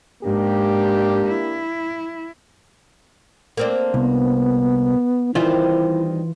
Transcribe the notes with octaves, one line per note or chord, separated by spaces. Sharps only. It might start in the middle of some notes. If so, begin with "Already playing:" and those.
G#2 A#3 D4 G4
E4
A#3 C4 D4
C2 B3
D#3 E3 G3 C4 E4 F4